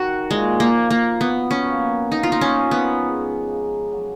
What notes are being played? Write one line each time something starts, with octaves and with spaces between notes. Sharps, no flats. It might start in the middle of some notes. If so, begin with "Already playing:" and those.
Already playing: D#3 F#4
A#2 G#3
A#3
F3
A#3
B3 F#4
C#4
A#3
A#3 D#4
F4
D#4
C#4
F3
B3
G#3
C#3
F#3